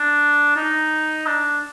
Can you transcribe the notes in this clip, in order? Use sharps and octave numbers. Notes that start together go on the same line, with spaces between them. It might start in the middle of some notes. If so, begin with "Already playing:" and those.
Already playing: D4
D#4
D4